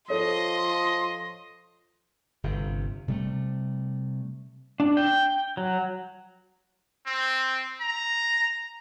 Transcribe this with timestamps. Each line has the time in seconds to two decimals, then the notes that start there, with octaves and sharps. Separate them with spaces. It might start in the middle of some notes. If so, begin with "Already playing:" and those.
0.10 F3 A4 C#5 D#5 C6
2.44 G1 C3
3.08 C3 G3 A3
4.80 D4
4.97 G5
5.57 F#3
7.07 C4
7.81 A#5